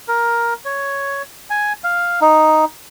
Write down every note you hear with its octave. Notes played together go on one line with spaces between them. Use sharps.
A#4
C#5
G#5
F5
D#4